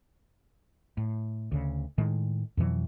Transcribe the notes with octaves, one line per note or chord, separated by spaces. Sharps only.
A2
D2 C#3
A2 D#3 G#3
F2 B2 E3 F#3